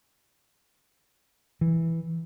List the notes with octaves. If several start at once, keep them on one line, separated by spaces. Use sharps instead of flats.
E3